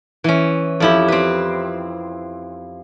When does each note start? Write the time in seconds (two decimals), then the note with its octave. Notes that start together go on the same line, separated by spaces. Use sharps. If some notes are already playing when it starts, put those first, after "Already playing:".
0.24 E3 C#4
0.80 F2 E4 G4
1.08 C4 B4